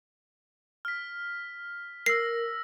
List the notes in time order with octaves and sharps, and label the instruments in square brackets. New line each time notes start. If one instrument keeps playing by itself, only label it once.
[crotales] F6 B6
[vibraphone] A#4 [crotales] E6 A#6 [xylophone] C7